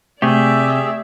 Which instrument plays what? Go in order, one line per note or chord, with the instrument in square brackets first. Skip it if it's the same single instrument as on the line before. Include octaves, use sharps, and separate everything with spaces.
[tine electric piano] C3 C4 [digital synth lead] A3 [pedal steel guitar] G4 G#4 [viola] D5 E5